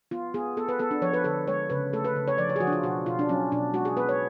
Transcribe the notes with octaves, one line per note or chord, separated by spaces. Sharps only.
B3 F4
B3 G#4
B3 A4
B4
B3 A4
D4
F3 C#5
B4
D3 A4
G#3 C#5
C#3 B4
A3 A4
B4
C#3
C#5
F3 D5
C#5
G#4
F3 F#4
D4
F4
B2 F#4
B2 F4
D4
F#3 C#4
B2 D4
G#3 F#4
G#4
B3 B4
C#5